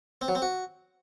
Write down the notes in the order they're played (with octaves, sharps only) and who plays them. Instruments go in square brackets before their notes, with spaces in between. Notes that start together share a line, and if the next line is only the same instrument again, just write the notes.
[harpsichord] C4
F#3
C4
F#4